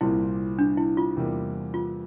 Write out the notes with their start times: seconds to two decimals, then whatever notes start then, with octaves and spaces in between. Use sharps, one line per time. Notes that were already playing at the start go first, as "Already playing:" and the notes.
0.01 C2 A#2 G3 C4 E4 G4
0.59 D4
0.77 E4
0.97 F4
1.16 E2 C3 G3 A#3
1.74 F4